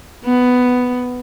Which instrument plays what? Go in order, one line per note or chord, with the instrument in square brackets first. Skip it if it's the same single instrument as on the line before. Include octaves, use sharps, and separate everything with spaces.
[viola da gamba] B3